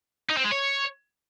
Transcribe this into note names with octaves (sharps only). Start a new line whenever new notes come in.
D#4
C4
G#3
C#5